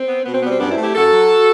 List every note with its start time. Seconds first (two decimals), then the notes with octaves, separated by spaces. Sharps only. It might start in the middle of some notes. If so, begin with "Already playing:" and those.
Already playing: C4
0.08 B3
0.25 B2 B3
0.34 C4
0.43 G3 B3
0.51 C4
0.60 F#2 B3 D4
0.71 C4 E4
0.77 A3
0.83 E4 G4
0.95 F#2 F#4 A4
1.13 F#3